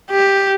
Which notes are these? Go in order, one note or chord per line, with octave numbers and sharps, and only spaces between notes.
G4